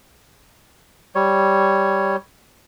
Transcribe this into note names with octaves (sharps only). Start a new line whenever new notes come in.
G3 C#5